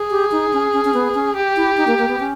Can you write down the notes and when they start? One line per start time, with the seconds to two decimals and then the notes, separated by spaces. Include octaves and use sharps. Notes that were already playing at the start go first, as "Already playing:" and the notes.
Already playing: G#4
0.10 G4
0.32 D#4
0.53 C#4
0.73 C#4
0.85 C#4
0.94 B3
1.15 C#4
1.36 G4
1.56 E4
1.77 D#4
1.87 A#3
1.98 A#3
2.09 B3
2.20 C#4